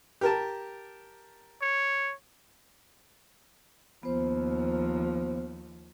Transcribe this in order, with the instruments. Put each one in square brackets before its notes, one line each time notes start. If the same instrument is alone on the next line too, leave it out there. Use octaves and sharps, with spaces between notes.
[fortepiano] G4 A#4 A5
[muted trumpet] C#5
[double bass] D#2 F3 [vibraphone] B3 C5